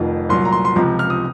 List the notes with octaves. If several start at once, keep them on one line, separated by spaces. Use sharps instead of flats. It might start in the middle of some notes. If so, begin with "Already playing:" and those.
Already playing: F1 F2 D#3
C2 A#2 F#3 C6
A#5
C6
C6
C#2 C3 F3 A#5
F6
D#6